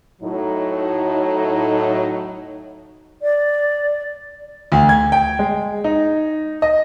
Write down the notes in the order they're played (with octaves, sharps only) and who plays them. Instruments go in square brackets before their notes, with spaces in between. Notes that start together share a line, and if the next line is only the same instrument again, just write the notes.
[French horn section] A2 F#3 D#4
[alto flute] D5
[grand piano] D2
G#6
G5
G#3
D#4
D#5